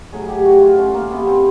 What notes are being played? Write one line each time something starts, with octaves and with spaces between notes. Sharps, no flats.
A2 F#3 G#4
G4
F#4
F4
C#4
A#3
C3 E3 B3
C4